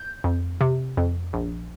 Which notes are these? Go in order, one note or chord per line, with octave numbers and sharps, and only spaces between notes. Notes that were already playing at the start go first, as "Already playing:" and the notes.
Already playing: G6
F2
C3
F2
A#1